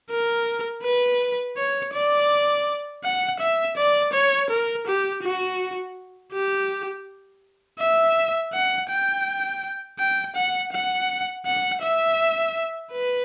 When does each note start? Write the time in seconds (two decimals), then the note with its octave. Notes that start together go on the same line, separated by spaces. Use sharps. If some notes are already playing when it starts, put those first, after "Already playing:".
0.11 A#4
0.84 B4
1.57 C#5
1.93 D5
3.04 F#5
3.40 E5
3.77 D5
4.13 C#5
4.50 A#4
4.87 G4
5.23 F#4
6.33 G4
7.80 E5
8.53 F#5
8.90 G5
9.99 G5
10.36 F#5
10.72 F#5
11.46 F#5
11.82 E5
12.93 B4